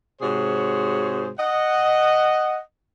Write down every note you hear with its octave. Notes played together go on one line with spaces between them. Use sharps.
G#2 C3 F#4 G#4 C5 C#5
D#5 F#5